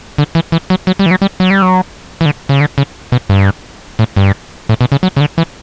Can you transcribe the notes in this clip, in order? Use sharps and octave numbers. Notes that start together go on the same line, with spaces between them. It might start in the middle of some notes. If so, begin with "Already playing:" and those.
D3
E3
E3
F#3
F#3
G3
E3
F#3
G3
F#3
G3
F#3
E3
D3
C#3
D3
C#3
B2
G2
A2
G2
A2
B2
C#3
F#3
C#3
D3
E3